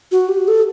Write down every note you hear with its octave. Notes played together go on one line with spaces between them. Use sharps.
F#4
G4
A4